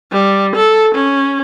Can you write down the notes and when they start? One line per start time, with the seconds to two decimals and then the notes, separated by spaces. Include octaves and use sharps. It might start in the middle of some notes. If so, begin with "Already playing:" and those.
0.12 G3
0.55 A4
0.95 C#4